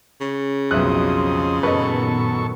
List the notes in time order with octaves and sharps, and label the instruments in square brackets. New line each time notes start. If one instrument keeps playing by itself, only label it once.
[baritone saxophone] C#3
[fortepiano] B1 E5 F#6 [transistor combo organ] F2 C4 D#5
[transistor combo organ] F#2 A4 C#6 [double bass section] A#2 D#3 B3 [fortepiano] B4 D#5